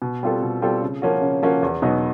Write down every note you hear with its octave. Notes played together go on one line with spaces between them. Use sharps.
B2
G3 C4 F4 A4
B2
G3 C4 F4 A4
C#3
F3 A#3 C#4 F#4
C#3
F3 A#3 C#4 F#4
E2
B2 F#3 B3 D#4